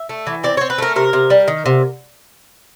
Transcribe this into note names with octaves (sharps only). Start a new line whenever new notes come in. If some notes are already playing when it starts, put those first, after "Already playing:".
Already playing: E5
A3
E3
C4 D5
C4 C#5
B4
A3 A#4
C3 A#4
C3
G3
D#3
C3